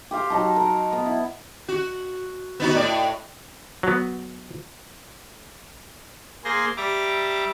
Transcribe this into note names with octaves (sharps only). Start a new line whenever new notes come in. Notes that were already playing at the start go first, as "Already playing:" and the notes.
G4 C5 F5
F#3 D#4 A5
A#4
B3
E4
F#4
B3 D#4 F#4
A2 D5
F#3 B3
A#3 G#4 C5 C6 A#6
G3 E5 A#5 D6